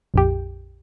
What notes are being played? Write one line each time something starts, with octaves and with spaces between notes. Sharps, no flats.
A#1 F2 G4